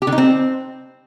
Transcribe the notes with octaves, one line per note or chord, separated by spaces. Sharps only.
G4
D3
D#4
C4